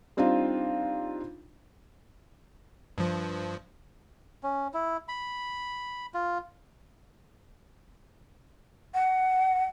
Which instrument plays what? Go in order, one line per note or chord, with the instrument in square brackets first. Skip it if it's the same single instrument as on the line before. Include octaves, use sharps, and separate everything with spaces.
[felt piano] G3 C4 D4 D#4 F4
[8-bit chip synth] G2 F3
[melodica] C#4
E4
B5
F4
[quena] F#5